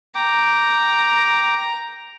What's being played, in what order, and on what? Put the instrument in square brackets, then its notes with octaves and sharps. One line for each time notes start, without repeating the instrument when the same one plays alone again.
[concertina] G5 D6 [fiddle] A#5